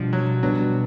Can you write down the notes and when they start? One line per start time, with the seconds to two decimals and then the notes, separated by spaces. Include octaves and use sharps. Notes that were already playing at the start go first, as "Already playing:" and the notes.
Already playing: B2 F3 G3 D4
0.13 F#3
0.43 B2 F#3 G3 B3 D4